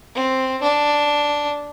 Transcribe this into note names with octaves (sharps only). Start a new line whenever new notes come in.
C4
D4